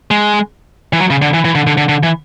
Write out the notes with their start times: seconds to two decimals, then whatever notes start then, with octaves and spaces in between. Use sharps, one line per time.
0.11 G#3
0.93 E3
1.00 F#3
1.10 C#3
1.22 D3
1.34 E3
1.45 E3
1.55 D3
1.67 D3
1.78 D3
1.89 D3
2.03 E3